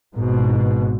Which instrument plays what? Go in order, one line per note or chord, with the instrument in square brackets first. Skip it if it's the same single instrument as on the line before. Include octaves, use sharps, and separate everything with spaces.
[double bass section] G#1 G#2 B2